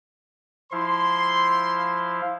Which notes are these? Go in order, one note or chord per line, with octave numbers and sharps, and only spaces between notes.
F3 E4 F5 C6